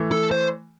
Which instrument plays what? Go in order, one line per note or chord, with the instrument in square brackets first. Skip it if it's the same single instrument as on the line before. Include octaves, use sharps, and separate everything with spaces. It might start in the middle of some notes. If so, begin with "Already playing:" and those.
Already playing: [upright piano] E3 A3
[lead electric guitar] A4
C5